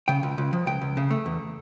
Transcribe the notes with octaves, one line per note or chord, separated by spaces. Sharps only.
C#3 G5
C#2
C#2
F3
C#2 G5
C#2
C#3
A3
E2